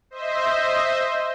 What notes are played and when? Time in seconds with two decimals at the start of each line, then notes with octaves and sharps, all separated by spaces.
0.11 C5 D#5 E5